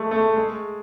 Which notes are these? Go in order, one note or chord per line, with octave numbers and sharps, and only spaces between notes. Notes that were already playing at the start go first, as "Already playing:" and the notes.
Already playing: G#3 A3
A3
G#3